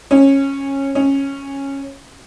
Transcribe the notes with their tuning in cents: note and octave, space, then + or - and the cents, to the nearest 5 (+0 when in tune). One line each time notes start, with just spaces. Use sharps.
C#4 -15
C#4 -10